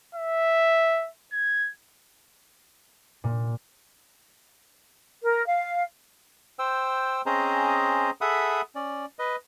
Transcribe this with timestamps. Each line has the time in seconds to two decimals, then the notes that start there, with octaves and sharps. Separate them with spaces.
0.15 E5
1.33 G#6
3.24 A#2
5.23 A#4
5.46 F5
6.59 C5 G5 E6
7.26 C4 C#4 G#4 C5 D#5 A#5
8.21 G#4 A4 E5 F#5 B5 D#6
8.75 C#4 D5
9.19 B4 D#5